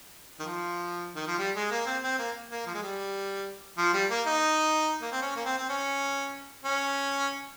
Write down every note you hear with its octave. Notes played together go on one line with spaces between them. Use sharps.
D#3
F3
D#3
F3
G3
G#3
A#3
C4
C4
A#3
A#3
F3
G#3
G3
F3
G3
A#3
D#4
A#3
C4
C#4
A#3
C4
C4
C#4
C#4